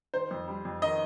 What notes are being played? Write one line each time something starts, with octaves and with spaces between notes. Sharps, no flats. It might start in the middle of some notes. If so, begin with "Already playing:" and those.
D#3 C5
F2
G3
F2
D#3 D#5